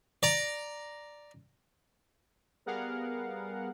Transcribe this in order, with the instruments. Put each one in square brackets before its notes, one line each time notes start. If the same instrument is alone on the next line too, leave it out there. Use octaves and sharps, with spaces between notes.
[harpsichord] D5 A#5
[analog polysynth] G3 B3 G#4 A#4 F5 F#5